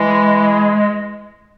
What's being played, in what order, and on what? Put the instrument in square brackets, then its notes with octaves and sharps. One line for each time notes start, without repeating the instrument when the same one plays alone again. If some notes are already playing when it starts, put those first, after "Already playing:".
Already playing: [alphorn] E3 [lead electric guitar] G#3